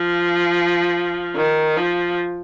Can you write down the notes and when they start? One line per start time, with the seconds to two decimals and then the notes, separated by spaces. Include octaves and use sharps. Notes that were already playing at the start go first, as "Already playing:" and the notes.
Already playing: F3
1.36 D#3
1.77 F3